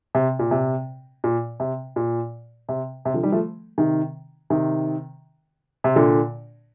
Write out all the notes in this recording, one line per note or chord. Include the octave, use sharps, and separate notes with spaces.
C3
A#2
C3
A#2
C3
A#2
C3
C3
D3 F3
D#3 G3
F3 A3
C3 D#3
C3 D#3
C3
A#2 D3